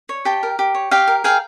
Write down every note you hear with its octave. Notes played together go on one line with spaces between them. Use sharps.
C#5
G4 G5 A5
A#4
G4
C#5
G4 F5 G5
A#4
G#4 F5 G5